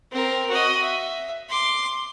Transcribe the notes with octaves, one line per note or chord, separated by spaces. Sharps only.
C4 A#4
F#4 D#5
E5
C6 D6